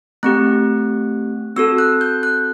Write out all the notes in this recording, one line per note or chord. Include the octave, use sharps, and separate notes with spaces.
A3 C4 G4 F#6
C4 F#4 A4 E6
F#6
G6
F#6